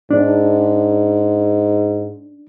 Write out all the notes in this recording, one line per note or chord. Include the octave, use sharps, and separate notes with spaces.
G#2 D4